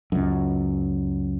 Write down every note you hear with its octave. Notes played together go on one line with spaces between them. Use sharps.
C#2 F#2